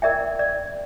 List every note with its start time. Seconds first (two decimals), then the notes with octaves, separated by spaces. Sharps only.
0.02 A#4 D5 E5 G5
0.39 D5